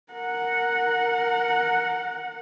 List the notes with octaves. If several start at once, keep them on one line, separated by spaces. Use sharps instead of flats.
A#4 F#5